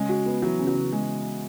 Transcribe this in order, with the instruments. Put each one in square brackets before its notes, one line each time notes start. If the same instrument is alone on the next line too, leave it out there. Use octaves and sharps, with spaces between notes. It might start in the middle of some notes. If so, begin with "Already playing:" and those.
Already playing: [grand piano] C#3 [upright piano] G#3
[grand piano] F#4
B3
[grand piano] E3 [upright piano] F#3
[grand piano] C#3
[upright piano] F#3
[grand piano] C#3
[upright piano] G#3